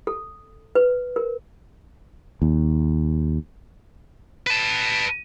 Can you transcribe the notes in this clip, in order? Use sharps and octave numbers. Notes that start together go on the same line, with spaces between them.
A4
B4
A#4
D#2
B4 A5